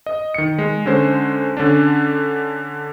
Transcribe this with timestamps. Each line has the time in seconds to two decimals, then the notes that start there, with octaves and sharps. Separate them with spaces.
0.06 D#5
0.34 D#3 C#7
0.58 G#3
0.86 D3 G#3 C#4 C5
1.57 D3 C#4 D4